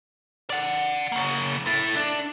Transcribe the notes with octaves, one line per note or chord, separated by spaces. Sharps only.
D5 F#5
C#3 A#3
E4 A4
D4